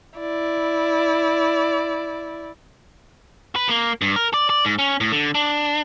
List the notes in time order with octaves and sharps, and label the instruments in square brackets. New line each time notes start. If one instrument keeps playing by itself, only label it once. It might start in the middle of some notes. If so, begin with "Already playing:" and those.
[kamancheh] E4 D5
[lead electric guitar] B4
A#3
G2
A#4
D5
D5
G#2
C#4
A2
D3
D4